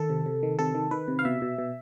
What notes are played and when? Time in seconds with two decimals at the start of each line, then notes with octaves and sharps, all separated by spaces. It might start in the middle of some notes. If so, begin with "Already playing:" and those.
Already playing: D#3 A4
0.10 C3
0.26 C3
0.43 D#3
0.59 C3 A4
0.75 D#3
0.91 D#3 B4
1.08 C3
1.19 F5
1.25 B2 E5
1.42 B2
1.59 B2